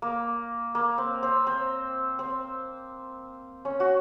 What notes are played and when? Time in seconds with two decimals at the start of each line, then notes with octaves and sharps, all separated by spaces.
0.02 A#3
0.75 A#3
0.98 C4
1.23 C4
1.47 C4
2.19 C4
3.65 C#4
3.80 F#4